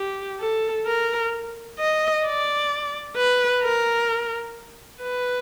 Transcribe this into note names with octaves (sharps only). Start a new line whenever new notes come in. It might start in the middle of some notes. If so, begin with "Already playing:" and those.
Already playing: G4
A4
A#4
D#5
D5
B4
A#4
B4